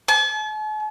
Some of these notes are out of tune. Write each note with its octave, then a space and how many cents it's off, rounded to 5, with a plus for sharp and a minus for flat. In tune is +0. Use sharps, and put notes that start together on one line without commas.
A5 -45